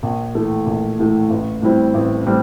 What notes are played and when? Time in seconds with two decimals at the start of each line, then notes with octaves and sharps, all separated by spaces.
0.03 A#1
0.35 A2 E3 A3
0.66 A#1
0.99 A2 E3 A3
1.30 A1
1.62 A2 G3 C4 E4
1.94 A1
2.26 A2 G3 C4